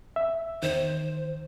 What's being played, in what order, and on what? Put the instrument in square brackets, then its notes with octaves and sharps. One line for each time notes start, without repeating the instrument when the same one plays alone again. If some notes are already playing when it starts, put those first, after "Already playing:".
[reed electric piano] E5
[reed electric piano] E2 D#3 [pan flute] C5